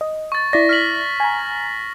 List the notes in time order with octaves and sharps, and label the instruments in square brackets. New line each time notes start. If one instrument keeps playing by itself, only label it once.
[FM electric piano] D#5
[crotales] C#6 A6
[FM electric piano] E4 D5 [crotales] A#6 B6
[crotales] F6 B6 F#7
[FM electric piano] G#5 A#5